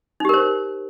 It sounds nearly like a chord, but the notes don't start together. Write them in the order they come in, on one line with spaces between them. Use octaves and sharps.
D#4 G4 A#4 C5